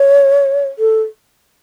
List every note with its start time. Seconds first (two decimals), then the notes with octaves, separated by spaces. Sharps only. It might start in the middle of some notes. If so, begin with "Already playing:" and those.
Already playing: C#5
0.79 A4